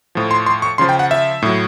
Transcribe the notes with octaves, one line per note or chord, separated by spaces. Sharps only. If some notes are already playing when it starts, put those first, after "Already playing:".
A2 F3
C6
C6
C#6
C#3 F3 C6
G5
F#5
E5
A2 F#3